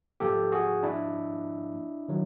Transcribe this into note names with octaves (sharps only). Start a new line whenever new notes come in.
G#2 F3 A#3 G4 A4
F#4 G#4
D4 E4
D#3 F#3